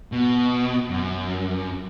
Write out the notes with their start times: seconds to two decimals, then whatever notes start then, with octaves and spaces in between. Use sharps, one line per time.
0.12 B2
0.90 F#2